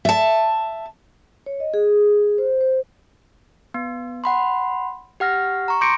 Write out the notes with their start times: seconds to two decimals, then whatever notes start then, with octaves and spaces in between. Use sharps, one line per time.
0.05 E5 A5
1.46 C#5
1.60 D#5
1.74 G#4
2.38 C5
2.61 C5
3.74 B3
4.24 F#5 B5 C6
5.20 G4 F#5 F6 A#6
5.68 A#5 C#6
5.81 C6 D6 G6 A#6 C#7 D7